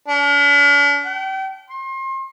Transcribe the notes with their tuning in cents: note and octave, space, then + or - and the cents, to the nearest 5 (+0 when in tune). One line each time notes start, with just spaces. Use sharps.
D4 -45
G5 -35
C6 +35